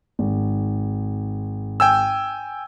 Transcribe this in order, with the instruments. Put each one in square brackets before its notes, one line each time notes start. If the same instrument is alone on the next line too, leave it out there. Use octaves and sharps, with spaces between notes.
[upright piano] G#1
[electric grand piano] G5 G#5 E6